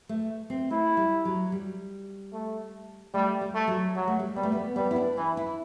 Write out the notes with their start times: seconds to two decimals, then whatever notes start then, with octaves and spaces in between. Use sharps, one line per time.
0.09 A3
0.50 C4
0.70 A3 E4
0.97 G3
1.25 F#3
1.52 G3
2.33 A3
3.14 G3 A3
3.41 G3
3.54 A3
3.67 F#3
3.95 F#3 G3
4.08 A3
4.19 G3
4.35 G3 B3
4.43 A3
4.52 B3
4.76 G3 B3
4.91 E4
4.96 D4
5.17 E3 D4
5.37 E4